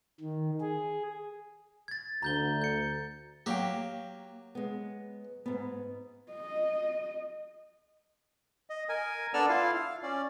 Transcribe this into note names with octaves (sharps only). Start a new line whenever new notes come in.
D#3
G#4
G#6 A6
D2 A#5 G6 G7
G6 C#7
F#3 A#3 G4 F5 G5
G#3 B3
G#2 B3
D#5
D#5
A#4 G#5
B3 D4 A4 D5 E6 F6
E4 F4 F5
F5
C#4 D5